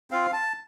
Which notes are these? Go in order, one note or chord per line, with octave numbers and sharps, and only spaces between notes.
C4 F4 F5
A5